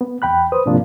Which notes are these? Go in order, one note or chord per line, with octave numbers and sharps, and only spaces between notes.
B3
E2 G5 B5 F#6
B4 C5 D#6
G#2 C3 F3 A#3 D4 F4